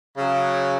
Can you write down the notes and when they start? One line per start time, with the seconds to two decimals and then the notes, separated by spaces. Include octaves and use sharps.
0.15 C#3 F#3